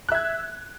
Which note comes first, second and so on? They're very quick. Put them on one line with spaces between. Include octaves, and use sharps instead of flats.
F#6 E5 G#6